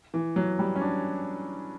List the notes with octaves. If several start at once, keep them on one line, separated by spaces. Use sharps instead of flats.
E3
F#3
G3
C#4
D4